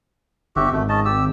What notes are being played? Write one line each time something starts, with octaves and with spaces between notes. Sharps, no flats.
G1 F#4 G4 E5
G#1 A3
C#4 D#5 A5
G4 E6